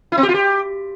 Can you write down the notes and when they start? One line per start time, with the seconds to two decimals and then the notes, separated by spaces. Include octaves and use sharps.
0.12 E4
0.18 C4
0.23 G4
0.29 F4
0.34 G4